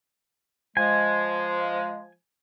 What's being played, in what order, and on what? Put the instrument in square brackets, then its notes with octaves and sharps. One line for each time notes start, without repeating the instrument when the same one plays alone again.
[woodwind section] F3 G#3 [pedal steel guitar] G#5